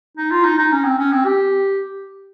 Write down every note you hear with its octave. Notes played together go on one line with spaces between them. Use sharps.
D#4
F4
D#4
D#4
C#4
C4
C#4
C4
G4